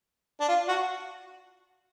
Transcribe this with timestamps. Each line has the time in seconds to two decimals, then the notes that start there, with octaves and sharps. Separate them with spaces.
0.40 D4
0.48 F4
0.68 F#4